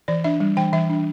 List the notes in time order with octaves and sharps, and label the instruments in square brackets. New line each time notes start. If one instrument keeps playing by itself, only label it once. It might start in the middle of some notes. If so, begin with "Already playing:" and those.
[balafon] E3 D5
D4 E5
G3
E3 G5
E3 E5
D4